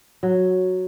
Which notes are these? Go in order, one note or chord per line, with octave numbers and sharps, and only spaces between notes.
F#3